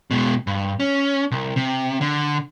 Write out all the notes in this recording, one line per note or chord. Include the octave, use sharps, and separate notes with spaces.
B2 G#3
G2
C#4
C2
C3
D3